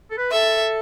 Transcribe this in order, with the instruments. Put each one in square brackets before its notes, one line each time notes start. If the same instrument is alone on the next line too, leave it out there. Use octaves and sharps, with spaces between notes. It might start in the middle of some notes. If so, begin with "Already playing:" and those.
[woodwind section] A4
B4
[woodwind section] A4 [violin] E5